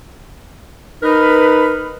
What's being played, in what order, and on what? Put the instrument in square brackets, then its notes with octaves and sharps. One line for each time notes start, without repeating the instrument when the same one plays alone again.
[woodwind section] D#4 A#4 B4